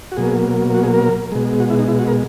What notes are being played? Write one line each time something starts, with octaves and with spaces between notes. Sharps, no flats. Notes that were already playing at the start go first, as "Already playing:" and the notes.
F#4
B2 F#3 A#3 G#4
F#4
G#4
A#4
B2 G#3
F#4
E4
D#4
E4
F#4
A#4